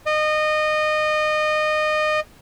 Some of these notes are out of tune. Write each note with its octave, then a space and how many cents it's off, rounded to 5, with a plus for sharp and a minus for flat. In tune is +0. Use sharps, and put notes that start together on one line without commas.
D#5 -25